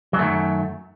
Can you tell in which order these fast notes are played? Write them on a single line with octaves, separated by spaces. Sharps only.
F#3 F#2 A3 D#3